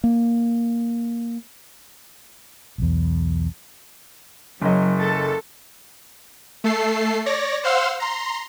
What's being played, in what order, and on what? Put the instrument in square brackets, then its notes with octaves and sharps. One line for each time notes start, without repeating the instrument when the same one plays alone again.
[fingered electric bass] A#3
[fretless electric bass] B1 E2
[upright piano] F#1 D#5 [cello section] F#3
[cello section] A4
[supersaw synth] A3 A4 C7
C#5 D5 A#6
C5 F5 F#5 C6 E6
A#5 C6